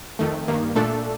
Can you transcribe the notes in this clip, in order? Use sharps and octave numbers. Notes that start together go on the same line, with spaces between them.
F2 D#3 A3
G2 D#3 A#3
A#2 A3 D4 A4